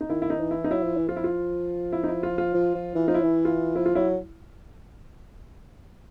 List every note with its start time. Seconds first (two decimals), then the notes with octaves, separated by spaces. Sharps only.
0.01 D#4
0.10 D#3 E4
0.22 E4
0.30 D#4
0.40 E3
0.51 E4
0.64 D#4
0.70 F#3 E4
0.83 F3
0.97 E3
1.08 F3 F4
1.16 E4
1.24 F4
1.92 E4
2.03 D#4
2.08 E4
2.23 F4
2.38 F4
2.54 F3
2.75 F3
2.95 E3
3.08 F3 D#4
3.14 E4
3.22 E3
3.45 F4
3.76 F3 E4
3.86 F4
3.95 F#3 E4